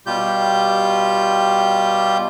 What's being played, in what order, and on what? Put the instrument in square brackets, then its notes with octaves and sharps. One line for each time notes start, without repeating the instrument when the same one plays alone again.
[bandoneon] B2 G3 F4 G4 G6